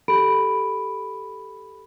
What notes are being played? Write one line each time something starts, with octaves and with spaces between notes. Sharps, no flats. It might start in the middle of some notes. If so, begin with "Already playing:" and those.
G4 A4 B5 D7